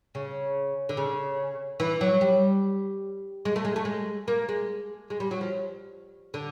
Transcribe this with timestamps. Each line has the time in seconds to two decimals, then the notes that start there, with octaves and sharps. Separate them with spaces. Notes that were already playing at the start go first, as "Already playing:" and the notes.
0.15 C#3
0.89 D3
0.97 C#3
1.80 E3
2.01 F#3
2.21 G3
3.45 G#3
3.56 A3
3.65 G#3
3.76 A3
3.85 G#3
4.28 A#3
4.49 G#3
5.10 G#3
5.20 G3
5.31 F#3
5.41 F3
6.34 D3